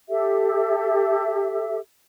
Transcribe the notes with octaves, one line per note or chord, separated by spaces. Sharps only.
G4 A4 E5